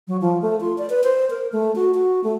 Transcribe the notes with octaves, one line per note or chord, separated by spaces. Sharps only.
F#3
F3
A3
F4
D5
B4
C5
A#4
A3
F#4
F#4
A3